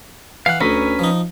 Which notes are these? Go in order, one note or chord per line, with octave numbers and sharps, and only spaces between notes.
E3 F5 F#5
D2 C#4 B4 A#5
F3 D#4